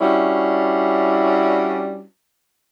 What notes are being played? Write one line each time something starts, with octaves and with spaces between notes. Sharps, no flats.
G3 C#4 D4 E4 F#4